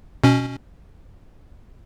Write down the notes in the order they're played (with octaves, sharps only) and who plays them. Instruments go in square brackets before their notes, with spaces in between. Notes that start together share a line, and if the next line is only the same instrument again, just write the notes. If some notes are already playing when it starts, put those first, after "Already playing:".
[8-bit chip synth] B2 C#4